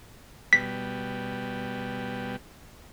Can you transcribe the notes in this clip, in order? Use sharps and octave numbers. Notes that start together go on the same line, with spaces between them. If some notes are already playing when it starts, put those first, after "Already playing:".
B2 G3 B6